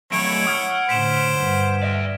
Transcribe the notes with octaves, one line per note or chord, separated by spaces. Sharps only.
F#3 A3 E4 C#5 D7
F#5 D#6 F6 G#6
A2 D3 C5 B6 D7 E7
G2
D5 E5